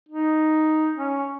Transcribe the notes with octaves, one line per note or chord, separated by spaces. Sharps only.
D#4
C#4